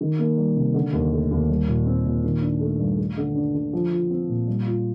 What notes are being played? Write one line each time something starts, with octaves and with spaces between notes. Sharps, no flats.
D#3
A#3
G3
C3
D3
D#2
A3
D#2
G3
A#2
C4
A#2
D#3
D4
A3
G2
A3
D3
D4
D3
F3
F4
C4
A#2
G3
F4